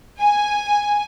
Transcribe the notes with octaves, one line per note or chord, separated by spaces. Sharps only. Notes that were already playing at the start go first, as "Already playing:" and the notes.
G#5